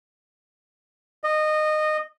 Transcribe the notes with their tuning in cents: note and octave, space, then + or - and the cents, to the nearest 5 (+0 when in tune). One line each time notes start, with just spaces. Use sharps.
D#5 -20